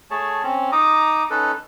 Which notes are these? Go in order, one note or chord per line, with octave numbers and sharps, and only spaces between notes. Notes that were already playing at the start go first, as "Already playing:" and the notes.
A3 G#4 C#5 A5
C4 C#4
D#4 A#5 D6 D#6
C#4 D#4 A4 B4